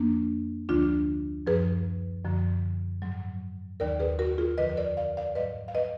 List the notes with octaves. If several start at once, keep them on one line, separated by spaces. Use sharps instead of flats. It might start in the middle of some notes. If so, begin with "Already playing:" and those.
Already playing: F2 F3 A#3 D4
D2 D3 F3 D4 F4
F#2 F3 G#4 B4
F#2 D3 F3
G#2 F#3
D#2 D#3 F#3 A#4 D5
G#4 B4
F#4 A#4
F4 G#4
F2 D3 F3 B4 D#5
B4
A#4 D5
D5 F5
D5 F5
G#2 F#3 B4 D#5
F5
B4 D#5